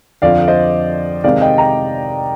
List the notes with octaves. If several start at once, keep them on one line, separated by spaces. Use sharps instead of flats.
F2 D3 F3 D5 F5
C5 D#5
C3 D#3 G#3 C4 D5 F5
D#5 G5
G5 A#5